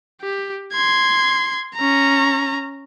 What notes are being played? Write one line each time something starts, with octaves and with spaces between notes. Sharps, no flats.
G4
C6 G#6
C#4 A#5